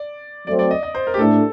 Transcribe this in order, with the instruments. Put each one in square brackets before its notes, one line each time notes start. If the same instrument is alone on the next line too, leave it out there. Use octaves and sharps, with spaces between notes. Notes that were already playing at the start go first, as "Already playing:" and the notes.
Already playing: [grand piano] D5
[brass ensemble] F#3 A3 C4 [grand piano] D5
[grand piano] D5
D#5
D#5
C5
A#4
G4
[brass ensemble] A2 A3 D4 [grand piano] A4